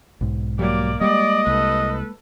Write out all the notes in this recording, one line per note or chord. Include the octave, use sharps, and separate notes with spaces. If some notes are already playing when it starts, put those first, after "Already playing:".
B1 G#2
F#3 G3 A#3 D5
G3 G#3 A#3 D5 D#5
C2 A4 B4